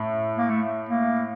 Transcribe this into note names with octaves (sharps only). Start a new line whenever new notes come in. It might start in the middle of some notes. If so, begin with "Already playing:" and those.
Already playing: A2
A#3
A3
A#3